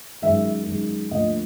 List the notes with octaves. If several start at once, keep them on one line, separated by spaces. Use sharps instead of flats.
F#2 D#3 G#3 E5
F#2 D#3 G#3
D2 D3 F3 A#3 D#5